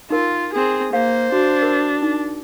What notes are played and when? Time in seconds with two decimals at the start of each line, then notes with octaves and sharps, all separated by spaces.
0.10 D#4 F4 A#4
0.54 C4 G#4
0.93 A#3 C5 F5
1.32 D4 F#4
1.62 A#4
2.02 D#4